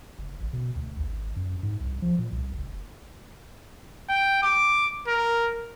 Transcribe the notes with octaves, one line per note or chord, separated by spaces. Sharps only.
F#1
A1
B2
D2
G#1
F#2
G#2
C2
F3
A#2
C2
F#1
G5
D6
A#4